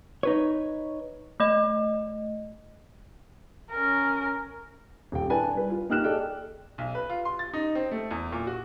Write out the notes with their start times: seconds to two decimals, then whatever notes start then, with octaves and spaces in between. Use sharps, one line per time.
0.23 D#4 B4 C#5
1.40 A3 D#5
3.71 C#4 A#4
5.12 D#1 G5
5.29 D4 E4 B4 G#5 A5
5.55 G3 B4
5.70 F4
5.89 A#3 D#4 G4 F6 F#6 E7
6.04 G#4 A4 D5 D#5 G5
6.78 B1
6.95 B4
7.10 F4
7.25 C6
7.39 A6
7.53 D#4
7.75 C4
7.91 A3
8.11 E2
8.32 A#2
8.47 F#4